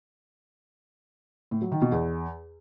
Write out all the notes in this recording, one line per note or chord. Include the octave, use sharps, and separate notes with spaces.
A2
F#3
D#3
B2
E2